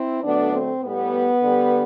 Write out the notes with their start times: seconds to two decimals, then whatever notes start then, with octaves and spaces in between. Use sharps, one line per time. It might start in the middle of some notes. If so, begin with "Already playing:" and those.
Already playing: C4 E4
0.23 D3 F#3 A3 B3 D4
0.54 C4
0.83 A2 G3 B3
1.42 D3 G3